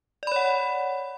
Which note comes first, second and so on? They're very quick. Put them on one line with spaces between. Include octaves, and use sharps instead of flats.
D5 B5 C#5 F#5